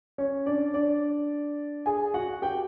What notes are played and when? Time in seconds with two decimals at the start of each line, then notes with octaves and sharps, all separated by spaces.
0.18 C#4 C#5
0.46 D4 D5
0.74 D4 D5
1.86 G#4 G#5
2.14 F#4 F#5
2.42 G4 G5